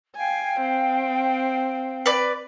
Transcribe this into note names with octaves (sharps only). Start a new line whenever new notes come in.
F5 G5 G#5
C4
B4 D5